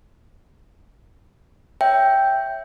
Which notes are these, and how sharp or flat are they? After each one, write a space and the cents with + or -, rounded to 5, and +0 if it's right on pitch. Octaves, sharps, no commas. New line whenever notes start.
C#5 +0 E5 +0 G5 +0